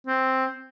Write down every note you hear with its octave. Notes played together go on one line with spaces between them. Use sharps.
C4